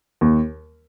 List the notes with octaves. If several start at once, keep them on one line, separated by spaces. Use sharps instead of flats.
D#2